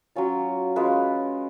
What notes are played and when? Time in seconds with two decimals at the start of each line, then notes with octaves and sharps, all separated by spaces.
0.16 F#3 C#4 F4
0.76 G#3 C#4 F4 B4